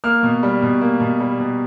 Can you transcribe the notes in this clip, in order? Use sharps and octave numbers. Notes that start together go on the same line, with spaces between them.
A#3 F6
B2
G3
B2
A#3
B2
G3
B2